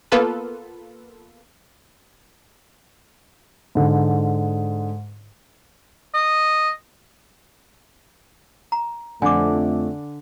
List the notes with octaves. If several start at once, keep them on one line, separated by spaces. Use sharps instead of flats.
A#3 B3 F4 A4 B4
G#2 D3
D#5
A#5
F2 D3 A3 D5 G#5 D6